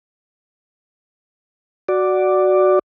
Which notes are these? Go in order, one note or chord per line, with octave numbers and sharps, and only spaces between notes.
F#4 D5